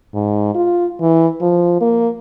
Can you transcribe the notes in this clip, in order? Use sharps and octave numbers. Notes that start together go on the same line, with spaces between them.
G#2
F4
E3
F3
A#3